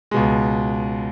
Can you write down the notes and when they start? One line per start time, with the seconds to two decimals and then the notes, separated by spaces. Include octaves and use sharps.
0.11 C#2 B2 G#3